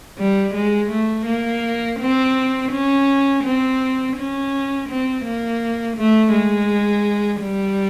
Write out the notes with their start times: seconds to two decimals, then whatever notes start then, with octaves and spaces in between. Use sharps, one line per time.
0.18 G3
0.54 G#3
0.90 A3
1.26 A#3
2.00 C4
2.71 C#4
3.44 C4
4.17 C#4
4.89 C4
5.25 A#3
5.97 A3
6.33 G#3
7.42 G3